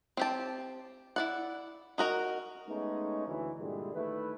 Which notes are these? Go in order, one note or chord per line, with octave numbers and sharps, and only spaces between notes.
C4 G4 A5
E4 D5 F#5
D#4 F#4 A#4
G#3 A3 B3 C#4 D#4
D2 E3
G2 A#2 D3 E3 G3 G#3
D#2 D#3 A3 E4 B4